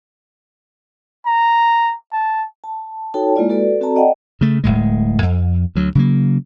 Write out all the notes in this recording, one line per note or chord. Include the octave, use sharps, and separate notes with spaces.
A#5
A5
A5
D#4 F#4 A4 C#5 G5 A5
G#3 A#3 E4 F4 D5
F#4 A4 B4 D5
C4 F#4 A4 D5 A5 A#5
D5 D#5 F#5 G5
C#3 A3
D1 C2 A2 G#3
F2
D2 F#3
C#3 F#3 A#3